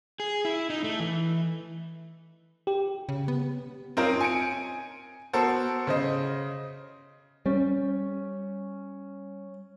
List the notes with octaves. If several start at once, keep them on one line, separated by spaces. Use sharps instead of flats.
G#4
E4
D#4
A3
E3
G4
C#3
B3
C4 C#4 D#4 F4 A#4 C5
G#5 C#7 D7
B3 F#4 A4 A#4 C5
C#3 C5 D#5
G3 C#4